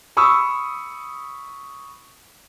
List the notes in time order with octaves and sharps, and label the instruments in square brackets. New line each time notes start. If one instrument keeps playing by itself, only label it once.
[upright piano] B5 C#6 D#6 E6